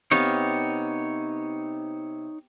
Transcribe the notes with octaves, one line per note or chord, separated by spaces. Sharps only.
C3 B3 D#4 C#5 F5